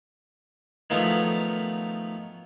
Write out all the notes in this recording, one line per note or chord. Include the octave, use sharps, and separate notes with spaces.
D#3 F3 F#3 A3 B3